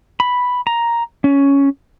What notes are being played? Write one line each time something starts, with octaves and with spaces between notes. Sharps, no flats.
B5
A#5
C#4